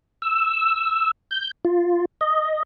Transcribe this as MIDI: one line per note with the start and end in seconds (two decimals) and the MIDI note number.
0.22 1.11 88
1.31 1.51 91
1.65 2.05 65
2.21 2.63 75